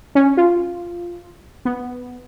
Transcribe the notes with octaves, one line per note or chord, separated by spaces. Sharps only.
C#4
F4
B3